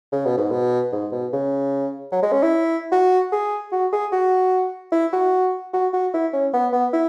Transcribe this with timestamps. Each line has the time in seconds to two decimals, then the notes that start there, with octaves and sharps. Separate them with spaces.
0.12 C#3
0.26 B2
0.37 G#2
0.51 B2
0.92 G#2
1.12 B2
1.33 C#3
2.12 F#3
2.23 G#3
2.32 C#4
2.43 E4
2.92 F#4
3.32 G#4
3.72 F#4
3.93 G#4
4.12 F#4
4.92 E4
5.13 F#4
5.73 F#4
5.94 F#4
6.14 E4
6.33 C#4
6.54 B3
6.73 B3
6.93 E4